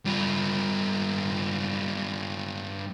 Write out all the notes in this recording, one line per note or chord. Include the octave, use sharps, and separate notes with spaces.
G2 F4